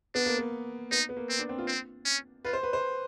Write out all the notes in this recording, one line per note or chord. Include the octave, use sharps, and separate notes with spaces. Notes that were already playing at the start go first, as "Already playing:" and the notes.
B3 D4
A#3
B3
B3 D#4
B3
A#3
C4
D4
C4
F4
C4
C#4
F4 B4
C5
B4
C5